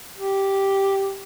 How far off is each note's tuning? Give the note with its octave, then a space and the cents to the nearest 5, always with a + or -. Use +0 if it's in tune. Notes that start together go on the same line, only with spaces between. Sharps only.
G4 -5